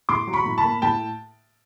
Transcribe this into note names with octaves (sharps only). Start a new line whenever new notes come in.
A2 C6 D6
F#3
B5 C#6
A2
A5 B5
A#3
A2 G5 A5